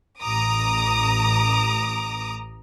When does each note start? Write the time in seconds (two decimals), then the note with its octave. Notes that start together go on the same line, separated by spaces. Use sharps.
0.21 A1 A#5 D6 D#6